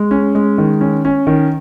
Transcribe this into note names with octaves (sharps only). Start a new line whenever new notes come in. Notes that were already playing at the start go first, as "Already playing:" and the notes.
Already playing: G#3
C#4
G#3
D#3
C#4
C#4
D#3